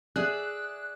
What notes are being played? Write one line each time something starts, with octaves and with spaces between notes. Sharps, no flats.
G#4 D5 E5 F#6